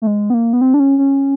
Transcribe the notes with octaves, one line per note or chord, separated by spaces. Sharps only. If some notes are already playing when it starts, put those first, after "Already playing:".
A3
G#3
B3
A#3
B3
C4
D4
C#4
C#4